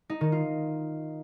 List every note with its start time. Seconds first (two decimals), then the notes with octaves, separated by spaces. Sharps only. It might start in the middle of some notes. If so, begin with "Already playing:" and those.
0.10 D#4
0.21 D#3
0.32 F4